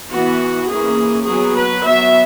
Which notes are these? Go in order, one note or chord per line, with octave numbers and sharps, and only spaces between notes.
E3 B3 F#4
E3 A#3 C#4 G#4
F#3 B3 G#4
B4
F#3 B3 E5